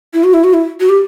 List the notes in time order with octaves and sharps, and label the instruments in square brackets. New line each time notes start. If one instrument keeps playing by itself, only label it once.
[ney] E4
F#4
E4
F#4
E4
F#4
G4